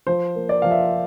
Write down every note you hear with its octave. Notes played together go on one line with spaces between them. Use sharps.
F3 C5
A#3
D5
F3 F5
E5